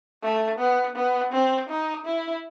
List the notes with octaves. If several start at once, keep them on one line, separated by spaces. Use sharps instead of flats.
A3
B3
B3
C4
D#4
E4